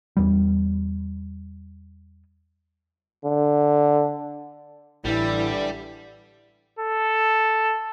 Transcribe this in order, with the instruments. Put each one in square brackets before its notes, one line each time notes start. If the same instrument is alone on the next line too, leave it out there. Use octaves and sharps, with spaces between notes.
[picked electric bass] E2 G3
[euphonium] D3
[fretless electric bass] A1 [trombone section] D3 E3 [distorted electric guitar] G3 [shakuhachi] E4
[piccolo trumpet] A4